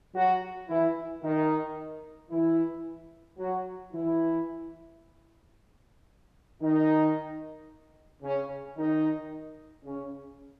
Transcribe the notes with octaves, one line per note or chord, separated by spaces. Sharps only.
F#3 F#4
E3 E4
D#3 D#4
E3 E4
F#3 F#4
E3 E4
D#3 D#4
C#3 C#4
D#3 D#4
C#3 C#4